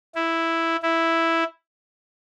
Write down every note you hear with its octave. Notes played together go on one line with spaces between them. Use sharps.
E4
E4